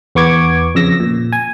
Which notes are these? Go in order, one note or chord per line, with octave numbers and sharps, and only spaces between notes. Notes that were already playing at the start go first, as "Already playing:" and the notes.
E2 B3 C#6 D6 G#6
F2 C#3 E6 A#6
A#2
G#5